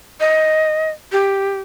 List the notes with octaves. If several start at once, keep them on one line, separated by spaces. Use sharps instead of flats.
D#5
G4